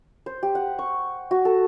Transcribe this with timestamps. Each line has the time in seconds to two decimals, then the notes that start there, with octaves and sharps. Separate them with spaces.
0.26 C5
0.43 G4
0.55 F#5
0.79 C#6
1.31 F#4
1.45 A4